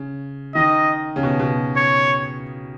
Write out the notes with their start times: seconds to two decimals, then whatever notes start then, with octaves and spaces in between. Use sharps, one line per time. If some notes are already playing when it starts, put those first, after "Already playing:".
Already playing: C#3
0.55 D#3 D#5
1.16 C#3
1.23 B2
1.39 B2
1.76 C#5